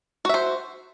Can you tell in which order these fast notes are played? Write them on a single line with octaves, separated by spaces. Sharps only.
F#4 E5 C5